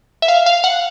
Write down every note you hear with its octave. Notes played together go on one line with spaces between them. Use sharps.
E5
F5
F5
F#5